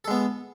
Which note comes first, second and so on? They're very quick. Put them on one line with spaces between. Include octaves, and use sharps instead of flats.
A4 G#3 B3